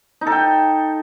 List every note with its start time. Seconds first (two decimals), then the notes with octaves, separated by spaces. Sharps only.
0.21 D#4
0.27 A4
0.32 G5